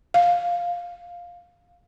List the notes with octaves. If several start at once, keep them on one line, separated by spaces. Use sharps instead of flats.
F5